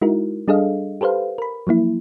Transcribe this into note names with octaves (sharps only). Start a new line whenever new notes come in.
G#3 D#4 E4 F#4 A#4
G3 D4 G#4 A4 D#5 F5
G4 A4 B4 C5 F5
A#4 B5
F3 F#3 A#3 E4